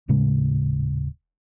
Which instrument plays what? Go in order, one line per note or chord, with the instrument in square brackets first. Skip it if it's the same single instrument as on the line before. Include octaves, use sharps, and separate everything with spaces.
[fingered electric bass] D#1 A2 C#3 G#3